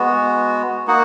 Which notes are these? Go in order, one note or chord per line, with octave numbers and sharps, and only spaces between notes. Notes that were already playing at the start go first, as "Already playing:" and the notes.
Already playing: G#3 B3 F#4
A#3 D#4 F#4 F#5